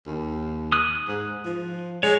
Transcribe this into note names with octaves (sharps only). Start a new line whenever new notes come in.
D#2
D#6 F#6
G#2
F3
G#3 C#5